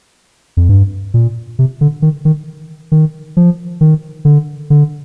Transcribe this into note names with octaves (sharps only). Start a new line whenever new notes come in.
F2
G2
A#2
C3
D3
D#3
D#3
D#3
F3
D#3
D3
D3